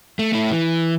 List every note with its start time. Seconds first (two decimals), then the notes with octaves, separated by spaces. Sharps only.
0.19 A3
0.33 A3 E4
0.52 E3